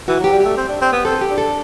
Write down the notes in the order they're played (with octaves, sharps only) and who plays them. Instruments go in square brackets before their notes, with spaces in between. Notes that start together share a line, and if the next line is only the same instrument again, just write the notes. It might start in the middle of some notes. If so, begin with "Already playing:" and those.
[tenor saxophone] E3 [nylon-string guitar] F#4
[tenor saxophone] F#3
[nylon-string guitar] G4
[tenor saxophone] G3
[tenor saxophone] A3 [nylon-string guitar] G4
[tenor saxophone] C4
D4
C4
B3
[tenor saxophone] C4 [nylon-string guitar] A4
[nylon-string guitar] G4
[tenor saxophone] D4
[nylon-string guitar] A4